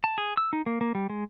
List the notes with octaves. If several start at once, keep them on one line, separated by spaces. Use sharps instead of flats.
A5
G#4
E6
D#4
A#3
A#3
G3
G#3